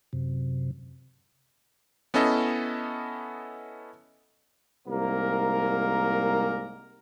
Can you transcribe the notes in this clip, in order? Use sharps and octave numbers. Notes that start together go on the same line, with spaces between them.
F#2 C3
B3 C#4 E4 A4 D#5
C2 G#2 A#3 A#4